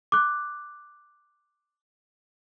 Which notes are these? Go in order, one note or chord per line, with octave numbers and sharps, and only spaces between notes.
D6 F#6